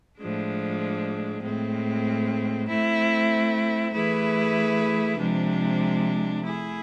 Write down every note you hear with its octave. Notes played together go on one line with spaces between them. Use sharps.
A2 F3 G#3 D4
A2 G#3 C4
A3 C4 E4
E3 A3 E4 G#4 B4
C3 F3 G#3 D4
A3 E4 G#4